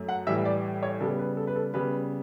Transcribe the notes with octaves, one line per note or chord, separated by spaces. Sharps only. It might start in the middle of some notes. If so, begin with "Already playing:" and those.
Already playing: F#2 A3
F#5
A2 E3 G3 E5
D5
C#5
C#3 G3 B3 A4
B4
A4
B4
A4
C#3 G3 B3 B4